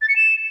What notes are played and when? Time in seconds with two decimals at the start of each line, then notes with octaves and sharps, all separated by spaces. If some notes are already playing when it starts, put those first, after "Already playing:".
0.02 A6
0.09 C#7
0.16 E7